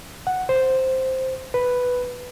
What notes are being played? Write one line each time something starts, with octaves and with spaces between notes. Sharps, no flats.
F#5
C5
B4